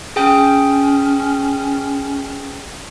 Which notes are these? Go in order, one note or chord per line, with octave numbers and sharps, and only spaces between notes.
C#4 G#4 G5